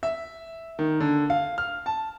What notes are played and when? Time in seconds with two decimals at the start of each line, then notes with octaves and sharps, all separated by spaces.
0.03 E5
0.79 D#3
1.00 D3
1.30 F5
1.58 F6
1.86 A5